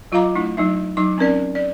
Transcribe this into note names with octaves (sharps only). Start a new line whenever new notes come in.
F#3 F4 D#5 F5 A#5 D6
A3 D4 E4
F#3 D#4 E5
F#3 D#4 D6
C4 C#4 A#4 D5
D5